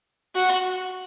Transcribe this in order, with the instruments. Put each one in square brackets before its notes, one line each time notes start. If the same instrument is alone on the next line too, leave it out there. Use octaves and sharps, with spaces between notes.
[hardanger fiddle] F#4